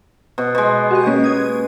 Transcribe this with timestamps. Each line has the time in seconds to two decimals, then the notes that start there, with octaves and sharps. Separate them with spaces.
0.38 B2
0.55 B2 G#3
0.91 F#4 G4 D#5
1.07 A#3 C#4 D#5
1.24 D#6 G#6